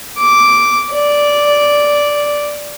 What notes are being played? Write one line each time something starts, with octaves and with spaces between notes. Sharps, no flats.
D6
D5